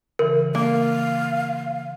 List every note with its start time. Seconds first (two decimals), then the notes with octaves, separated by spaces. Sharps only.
0.19 C#3 E3 A#4
0.55 A#3 F5